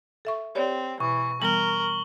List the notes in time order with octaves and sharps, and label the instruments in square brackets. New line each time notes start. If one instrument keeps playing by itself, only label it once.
[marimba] A4 E5 C#6
[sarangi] C4 [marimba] G4 C#5 D5
[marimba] B2 [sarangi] E3 [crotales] C#6
[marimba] E3 G3 B3 [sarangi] A#4 [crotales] F#7 G7